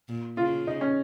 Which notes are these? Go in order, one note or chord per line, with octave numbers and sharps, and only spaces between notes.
A#2
C#3 F4
D#4
C#4